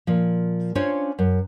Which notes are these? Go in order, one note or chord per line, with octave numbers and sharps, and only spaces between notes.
A#2 F3
C#4 D4 F4 C5 C#5
F#2